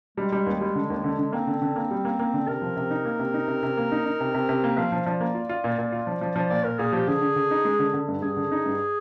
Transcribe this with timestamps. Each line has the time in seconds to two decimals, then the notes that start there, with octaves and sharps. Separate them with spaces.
0.18 G3 G#3
0.32 G3
0.46 D#2
0.61 G3
0.75 D3
0.90 D#2
1.04 D3
1.19 D3
1.33 A#3 C4
1.47 D3
1.62 D3
1.76 A#3
1.91 G3
2.05 A#3
2.19 A#3
2.34 D3
2.48 C3 A#4
2.62 F3
2.76 C3
2.91 D#4
3.05 A#3
3.19 C3
3.34 D#4
3.48 C3
3.63 C3
3.77 A#3
3.92 D#4
4.05 D#4
4.20 C3
4.34 C3
4.49 C3
4.63 A#3
4.78 F3 F5
4.92 F3
5.06 F3 D5
5.20 A#3
5.35 F4
5.49 F4
5.64 A#2
5.78 A#2
5.92 F4
6.07 F3
6.21 F3
6.36 F3
6.50 A#2 D5
6.64 A#2 A#4
6.79 A#2 G#4
6.93 F3 G4
7.08 D3 G#4
7.22 D3
7.36 D3
7.51 D#4
7.65 G#3
7.79 D3
7.94 D3
8.09 G2
8.22 G2 G#4
8.37 D3
8.52 D#4
8.66 G2